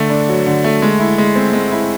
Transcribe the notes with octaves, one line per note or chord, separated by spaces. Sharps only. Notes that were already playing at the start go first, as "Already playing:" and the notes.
Already playing: D3 A3
D4
F#3
D3
A3
G#3
E4
G#3
C4
G#3
E4